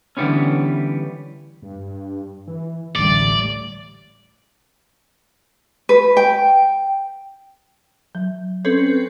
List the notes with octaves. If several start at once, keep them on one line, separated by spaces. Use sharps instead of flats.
D3 E3 G3 B3 C#4
G2
E3
D1 A1 D2 G3 A3 D5
B4
G5
F#3
C4 C#4 A4 B4